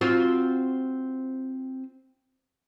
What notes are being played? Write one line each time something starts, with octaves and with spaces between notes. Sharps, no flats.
C4 F4 F#4